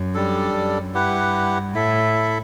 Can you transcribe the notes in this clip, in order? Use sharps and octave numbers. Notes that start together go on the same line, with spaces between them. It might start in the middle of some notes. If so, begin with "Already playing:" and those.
Already playing: F#2
G3 D4 A4
F#2
G2 E4 G4 B4 F#5
A2 E4 A4 E5